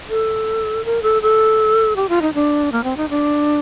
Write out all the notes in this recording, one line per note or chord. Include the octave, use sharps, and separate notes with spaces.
A4
A#4
A4
A4
G4
F4
D#4
D4
A#3
C4
D#4
D4